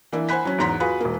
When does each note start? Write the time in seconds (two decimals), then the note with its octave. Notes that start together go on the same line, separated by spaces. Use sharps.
0.12 E3 A#3 D4 E4
0.29 C5 F#5 G#5 B5 F#6 B6
0.45 F#3 C#4
0.58 E2 G#2 A#5 C6 B6
0.80 F4 F#4 G#4 B4
1.01 E1 A#3